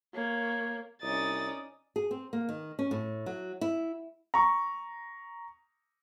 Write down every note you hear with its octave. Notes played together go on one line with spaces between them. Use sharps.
A#3 C#5
C2 C#4 D#4 D5 D#6 A6
G#4
C4
A#3
D#3
C#4
A2
F#3
E4
A#5 C#6